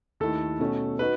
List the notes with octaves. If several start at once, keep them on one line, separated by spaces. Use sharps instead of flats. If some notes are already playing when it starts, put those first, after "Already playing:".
D#2 D#3 A3 E4 A4
B2 A3 C#4
D#4 F#4 B4